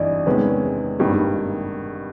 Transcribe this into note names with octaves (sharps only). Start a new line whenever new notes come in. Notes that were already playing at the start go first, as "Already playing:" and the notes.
Already playing: G#1 G2 E3 D5 D#5
E2 C3 D#3 G#3 C#4 B4
G#1 G2 D#3 G3 A#3